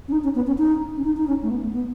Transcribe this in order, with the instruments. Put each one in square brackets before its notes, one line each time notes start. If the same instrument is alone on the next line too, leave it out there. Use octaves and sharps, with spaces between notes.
[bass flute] C#4
D#4
C#4
B3
C#4
D#4
C#4
D#4
D#4
C#4
A3
B3
A3
B3